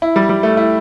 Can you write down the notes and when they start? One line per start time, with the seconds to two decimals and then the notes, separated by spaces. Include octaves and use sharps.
0.02 E4
0.16 G3
0.29 G3
0.43 A3
0.57 E4